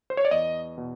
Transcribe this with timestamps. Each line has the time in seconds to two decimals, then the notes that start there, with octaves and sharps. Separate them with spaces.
0.10 C5
0.17 C#5
0.25 D5
0.31 E2 D#5
0.78 B2